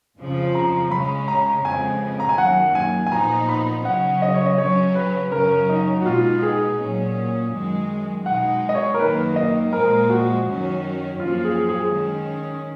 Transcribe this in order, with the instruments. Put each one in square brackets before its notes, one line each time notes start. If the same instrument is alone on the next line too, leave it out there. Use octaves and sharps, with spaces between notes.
[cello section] F2 C#3 F3
[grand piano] A#5
[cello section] C#3 G#3 C#4 [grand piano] B5
[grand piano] A#5
[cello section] F2 C#3 G#3 B3 [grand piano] G#5
[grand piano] A#5
G#5
[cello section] F#2 D#3 F#3 A#3 [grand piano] F#5
[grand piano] G#5
G#5
[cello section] A#2 F3 B3 D#4 [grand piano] A#5
[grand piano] B5
[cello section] C#3 F#3 C#4 [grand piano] F#5
[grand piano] D#5
C#5
D#5
[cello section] C#3 F#3 C#4 [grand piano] C#5
[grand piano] B4
[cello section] F#2 C#3 F#3 C#4 [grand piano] A#4
[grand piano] D#4
F#4
[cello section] B2 G#3 B3 D#4 [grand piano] F4
[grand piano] G#4
[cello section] A#2 F#3 C#4
F#2 D#3 G#3
[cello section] B2 G#3 D#4 [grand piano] F#5
[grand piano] D#5
C#5
A#4
[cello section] F#2 D#3 A#3 [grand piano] B4
[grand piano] D#5
[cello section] A#2 F3 G#3 [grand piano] A#4
[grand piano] F#4
[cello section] F#2 D#3 F#3 C#4
[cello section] F#2 F3 A#3 C#4 [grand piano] F4
[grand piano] G#4
G#4
[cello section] D#3 G#3 C#4